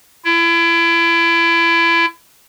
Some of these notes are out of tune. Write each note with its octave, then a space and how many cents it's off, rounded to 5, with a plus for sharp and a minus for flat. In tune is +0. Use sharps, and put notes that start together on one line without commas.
E4 +30